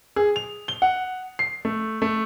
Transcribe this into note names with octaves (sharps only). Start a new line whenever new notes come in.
G#4
F7
G7
F#5
C7
A3
A3